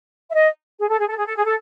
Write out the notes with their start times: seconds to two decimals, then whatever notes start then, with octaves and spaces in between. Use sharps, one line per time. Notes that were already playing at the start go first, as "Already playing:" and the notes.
0.29 E5
0.33 D#5
0.79 G#4
0.88 A4
0.98 G#4
1.07 A4
1.16 G#4
1.26 A4
1.35 G#4
1.44 A4